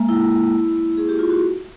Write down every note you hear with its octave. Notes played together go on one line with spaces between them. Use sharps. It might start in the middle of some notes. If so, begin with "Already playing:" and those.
Already playing: G#3 A#3
E4
G#4
G4
F4
F#4